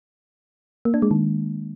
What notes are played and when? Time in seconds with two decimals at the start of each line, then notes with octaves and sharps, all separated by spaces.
0.85 A#3
0.94 D4
1.02 G#3
1.11 D#3